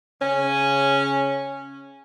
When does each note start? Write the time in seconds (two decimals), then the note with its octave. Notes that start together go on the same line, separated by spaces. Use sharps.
0.22 C#3 C#4